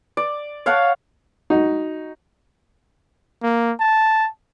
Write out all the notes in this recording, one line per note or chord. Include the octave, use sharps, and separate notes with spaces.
D5
C#5 F5 F#5 A5
D#4 F#4
A#3
A5